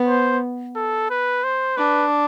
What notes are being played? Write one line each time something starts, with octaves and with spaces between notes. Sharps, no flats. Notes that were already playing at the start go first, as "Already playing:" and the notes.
Already playing: B3
C5
A4
B4
C5
D4 B4